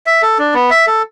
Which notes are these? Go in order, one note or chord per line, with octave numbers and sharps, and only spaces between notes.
E5
A4
D4
B3
E5
A4